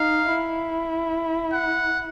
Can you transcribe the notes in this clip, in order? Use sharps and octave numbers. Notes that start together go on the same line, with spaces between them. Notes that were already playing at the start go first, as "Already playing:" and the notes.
Already playing: D#4 F5
E4
F#5